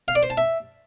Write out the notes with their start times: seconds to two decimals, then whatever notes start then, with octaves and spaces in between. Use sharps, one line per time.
0.08 F5
0.15 D5
0.23 C5
0.30 A5
0.37 E5